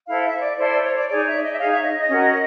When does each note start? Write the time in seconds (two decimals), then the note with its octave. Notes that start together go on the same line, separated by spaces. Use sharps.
0.07 E4 A4 C5 F5
0.24 E5
0.41 D5
0.57 E4 A4 C5 D5
0.70 D5
0.83 C#5
0.96 D5
1.08 D#4 G#4 C#5 D5
1.25 E5
1.34 D5
1.42 D#5
1.52 E5
1.58 D#4 G#4 C#5 F5
1.71 E5
1.84 D#5
1.97 D#5
2.09 C#4 F#4 A#4